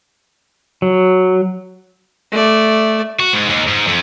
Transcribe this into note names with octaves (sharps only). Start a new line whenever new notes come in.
F#3
A3 D5
F#4
G#2
D#2
G#2
F2